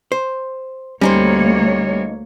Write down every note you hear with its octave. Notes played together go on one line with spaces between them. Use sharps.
C5
D2 G3 A#3 C#4 D#4 C5 C#5